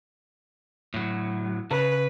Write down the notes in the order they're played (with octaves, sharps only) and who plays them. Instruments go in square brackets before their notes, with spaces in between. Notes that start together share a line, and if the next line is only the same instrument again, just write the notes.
[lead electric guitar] A2 F#3
[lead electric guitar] C#3 [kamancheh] B4